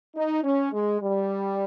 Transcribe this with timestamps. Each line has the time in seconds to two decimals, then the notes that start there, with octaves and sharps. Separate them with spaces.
0.16 D#4
0.43 C#4
0.72 G#3
1.01 G3